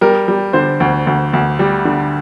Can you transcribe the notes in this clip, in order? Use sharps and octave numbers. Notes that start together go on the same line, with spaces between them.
G3 A#4
G3
D3 C5
D2
D2
D2
G3
D3